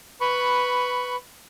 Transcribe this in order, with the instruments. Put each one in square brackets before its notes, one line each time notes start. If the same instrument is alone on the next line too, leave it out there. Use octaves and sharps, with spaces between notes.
[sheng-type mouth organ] B4 B5 C#6